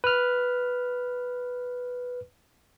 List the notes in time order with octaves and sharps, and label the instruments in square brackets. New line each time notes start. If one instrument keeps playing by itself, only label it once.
[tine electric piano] B4 F6